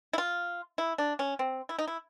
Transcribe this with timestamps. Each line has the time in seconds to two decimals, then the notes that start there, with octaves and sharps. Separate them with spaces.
0.13 E4
0.18 F4
0.78 E4
0.98 D4
1.19 C#4
1.39 C4
1.69 E4
1.79 D#4
1.87 E4